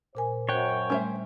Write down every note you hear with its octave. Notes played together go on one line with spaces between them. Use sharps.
A#2 A#4 C5 G#5
F#2 C5 C#5 G5 F#6
G3 A3 C#4 C5 E5